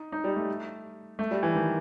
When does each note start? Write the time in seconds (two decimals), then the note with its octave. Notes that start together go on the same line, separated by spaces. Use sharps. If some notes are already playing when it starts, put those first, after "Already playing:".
Already playing: D#4
0.12 D#4
0.24 G3
0.36 A3
1.19 A3
1.31 G3
1.43 E3
1.55 D#3